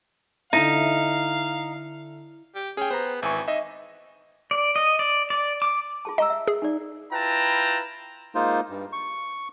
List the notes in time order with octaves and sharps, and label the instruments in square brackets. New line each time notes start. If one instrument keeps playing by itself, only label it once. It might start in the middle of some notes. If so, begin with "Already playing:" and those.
[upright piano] D3 E5 [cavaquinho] D#4 [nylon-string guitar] E4 [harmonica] F5
[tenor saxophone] G4
[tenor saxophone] C#4 [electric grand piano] G#4 G5
[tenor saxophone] B3 [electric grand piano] C5 A#5
[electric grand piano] G#1 G#5 C#6 [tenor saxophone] E3
[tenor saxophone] D#4 [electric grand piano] D#5 E5
[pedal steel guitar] D5
D#5
D5
D5
D6
[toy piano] F4 G#4 A5
[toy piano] F4 A#5 E6 [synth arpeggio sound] D#5
[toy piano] E5
[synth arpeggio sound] G#4
[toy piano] D#4 D5
[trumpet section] E4 F4 B4 G5 A5 A#5
[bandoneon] G#3 A#3 D#4 F4 C5
G2
C#6